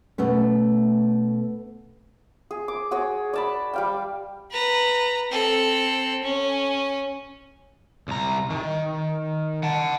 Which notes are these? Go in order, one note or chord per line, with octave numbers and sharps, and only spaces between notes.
B2 A3 B3 C#4
G#4
D6
F#4 G#4 C#5
D5 A5 B5
G3 F5 G5
B4 A#5
C4 A4
C#4
C2 A#5
D#3
F#5 A5